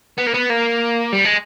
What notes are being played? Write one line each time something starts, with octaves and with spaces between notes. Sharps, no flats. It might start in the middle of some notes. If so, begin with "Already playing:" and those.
B3
A#3
B3
A#3
G3
G#3